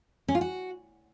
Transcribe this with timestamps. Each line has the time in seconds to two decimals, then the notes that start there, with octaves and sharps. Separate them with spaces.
0.28 C#4
0.35 F4
0.41 F#4